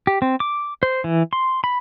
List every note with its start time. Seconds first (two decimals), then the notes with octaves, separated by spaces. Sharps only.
0.07 G4
0.22 C4
0.40 D6
0.83 C5
1.04 E3
1.33 C6
1.64 B5